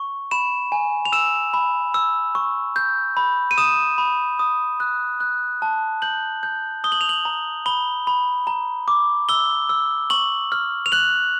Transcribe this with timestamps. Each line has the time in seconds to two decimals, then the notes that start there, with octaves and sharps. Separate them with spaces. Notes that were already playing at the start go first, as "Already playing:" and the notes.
Already playing: C#6
0.31 B5 E7
0.72 G#5
1.05 F7
1.12 E6 E7
1.54 B5
1.94 E6
2.35 C#6
2.76 G6
3.17 B5
3.51 D#7
3.58 D#6 E7
3.98 B5
4.39 D#6
4.80 F#6
5.20 F#6
5.62 A5
6.02 G6 F#7
6.43 G6
6.84 D#6 G7
6.92 F#7
7.01 F7
7.09 F#7
7.25 A#5
7.66 B5 G7
8.07 B5
8.47 A#5
8.88 D6
9.29 E6 G7
9.69 E6
10.10 C#6 F#7
10.52 F6
10.86 F7
10.92 F#6 F#7